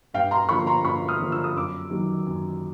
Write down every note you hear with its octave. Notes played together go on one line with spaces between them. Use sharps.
G2 F5 G5
A#5 C6
D3 F3 A#3 B5 C#6
A#5 C6
G2 B5 C#6
D#6 F6
D3 F3 A#3
E6
D#6
F#2 D6 E6
D#3 F#3
F#2